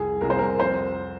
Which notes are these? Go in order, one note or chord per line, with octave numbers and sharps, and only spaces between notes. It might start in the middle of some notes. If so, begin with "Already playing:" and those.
Already playing: C2 F2 G#4
C2 A#4
C5
A#4
F2 C5